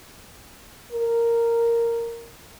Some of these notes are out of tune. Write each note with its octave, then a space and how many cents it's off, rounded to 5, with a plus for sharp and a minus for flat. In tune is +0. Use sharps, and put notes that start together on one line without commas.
A#4 -5